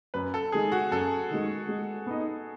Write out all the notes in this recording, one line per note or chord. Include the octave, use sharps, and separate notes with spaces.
F#2 B4
A4
D#3 G#3 G#4
F#4
F#2 A4
D#3 G#3
G#3
B3 D#4